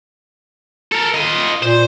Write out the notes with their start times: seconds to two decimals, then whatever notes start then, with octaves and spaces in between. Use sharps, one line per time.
0.92 A4 A#4
1.14 F4 D#5
1.63 A#2 C5